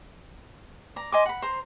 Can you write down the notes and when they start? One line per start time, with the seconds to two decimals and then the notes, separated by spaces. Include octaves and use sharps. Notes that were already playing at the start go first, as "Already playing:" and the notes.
0.96 D5 A#5
1.12 D#5 G#5 C6 D6
1.26 F#5 B5
1.42 C5 A#5 C6